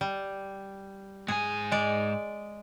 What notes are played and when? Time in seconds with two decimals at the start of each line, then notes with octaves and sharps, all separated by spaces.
0.01 G3
1.28 G#2 G#4 G#5
1.72 G#3 D5